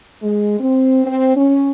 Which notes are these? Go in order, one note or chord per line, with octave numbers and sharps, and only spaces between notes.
G#3
C4
C4
C#4